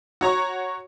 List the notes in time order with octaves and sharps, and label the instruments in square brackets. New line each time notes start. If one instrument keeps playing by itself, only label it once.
[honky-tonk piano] F#4 C#5 A#5 C#6